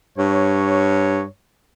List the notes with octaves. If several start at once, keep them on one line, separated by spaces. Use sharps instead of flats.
G2 C#5